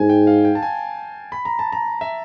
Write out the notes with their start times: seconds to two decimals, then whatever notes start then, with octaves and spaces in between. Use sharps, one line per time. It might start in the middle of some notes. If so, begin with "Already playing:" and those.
Already playing: G#2 G#5
0.10 G5
0.27 F5
0.45 G5
0.55 A5
0.63 G#5
1.32 B5
1.45 A#5
1.59 A5
1.72 A#5
2.01 E5